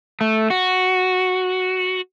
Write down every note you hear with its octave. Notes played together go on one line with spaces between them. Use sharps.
A3
F#4